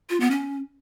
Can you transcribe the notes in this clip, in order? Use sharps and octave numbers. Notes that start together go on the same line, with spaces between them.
F4
B3
C#4